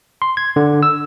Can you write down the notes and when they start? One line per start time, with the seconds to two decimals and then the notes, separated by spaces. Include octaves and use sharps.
0.22 C6
0.37 G#6
0.56 D3
0.83 E6